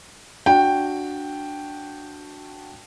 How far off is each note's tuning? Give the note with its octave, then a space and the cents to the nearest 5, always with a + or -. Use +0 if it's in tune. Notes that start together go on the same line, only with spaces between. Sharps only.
D4 +0 F#4 -5 G5 +0